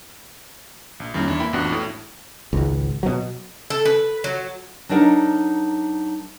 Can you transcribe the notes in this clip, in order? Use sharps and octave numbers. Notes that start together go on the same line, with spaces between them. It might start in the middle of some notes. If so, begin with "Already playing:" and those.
A#1
F2 D#3 G3 A#3 C#4 E4
E2 D4 E4
A#3 E4 G5 B5
A1 F2 B3 D4 F#4 F#6
A2
G#1 C#2
B2 F#3
A4
B4
F#3
F#3 D4 D#4 A#4 F#5